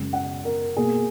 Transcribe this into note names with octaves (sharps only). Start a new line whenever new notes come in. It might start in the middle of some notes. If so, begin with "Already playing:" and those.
Already playing: F#2 C#3 G#3
F#5
A#4
B2 A#3 G#4